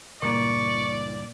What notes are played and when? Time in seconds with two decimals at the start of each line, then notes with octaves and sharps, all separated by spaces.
0.22 C#2 G2 A#2 E3 A#3 D5 C#6